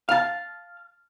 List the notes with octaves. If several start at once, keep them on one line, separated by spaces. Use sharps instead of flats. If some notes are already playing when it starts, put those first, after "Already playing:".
F5 A5